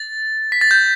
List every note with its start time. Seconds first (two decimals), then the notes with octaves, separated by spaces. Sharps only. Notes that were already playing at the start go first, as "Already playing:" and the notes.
Already playing: A6
0.52 B6
0.61 A6
0.71 G6